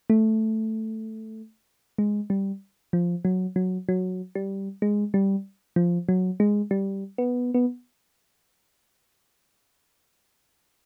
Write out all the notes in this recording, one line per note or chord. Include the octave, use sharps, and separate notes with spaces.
A3
G#3
G3
F3
F#3
F#3
F#3
G3
G#3
G3
F3
F#3
G#3
G3
B3
B3